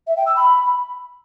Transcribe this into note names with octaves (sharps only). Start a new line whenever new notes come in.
E5
G5
E6
B5